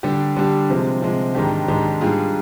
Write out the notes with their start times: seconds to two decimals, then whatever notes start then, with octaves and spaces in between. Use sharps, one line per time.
0.03 D3 G3 D4 G4
0.37 D3 G3 D4 G4
0.70 C3 F3 G#3
1.02 C3 F3 G#3
1.35 G#2 D#3 G#3 D4 G4
1.68 G#2 D#3 G#3 D4 G4
2.01 G#2 G3 D4 F4 G#4